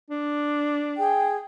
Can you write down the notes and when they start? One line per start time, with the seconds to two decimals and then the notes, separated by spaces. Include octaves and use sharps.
0.10 D4
0.97 G#4 G5